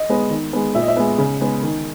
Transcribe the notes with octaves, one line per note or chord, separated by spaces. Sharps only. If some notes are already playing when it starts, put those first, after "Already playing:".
Already playing: D#5
G#3 B3
D#3
G#3 B3
A#2 E5
D#5
E5
G#3 B3
C#3
G#3 B3
D#3